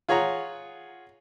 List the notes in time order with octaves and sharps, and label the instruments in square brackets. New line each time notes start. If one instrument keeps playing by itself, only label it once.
[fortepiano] F4 G#4 C#5 F#5 A#5